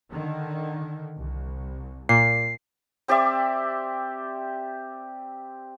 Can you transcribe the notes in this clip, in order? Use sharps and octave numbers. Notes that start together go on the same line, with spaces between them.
D3 D#3
C2
A#2 C7
C4 G4 D5 E5